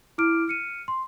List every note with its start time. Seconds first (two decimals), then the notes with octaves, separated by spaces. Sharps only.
0.18 E4 D6 F6 D7
0.48 F6 C#7 D#7
0.88 C6